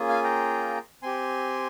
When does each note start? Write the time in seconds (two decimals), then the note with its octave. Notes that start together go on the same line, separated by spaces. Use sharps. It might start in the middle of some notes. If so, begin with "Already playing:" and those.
Already playing: A#3 C#4 F4 G#4
0.09 F5 G#5
0.24 G5 A#5
1.02 C4 G4 G#5 C6